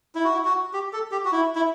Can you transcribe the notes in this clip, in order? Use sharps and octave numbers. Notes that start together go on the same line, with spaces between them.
E4
F#4
E4
F#4
G4
A4
G4
F#4
E4
E4